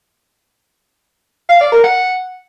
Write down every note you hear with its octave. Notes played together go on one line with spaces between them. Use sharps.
F5
D5
A#4
F#5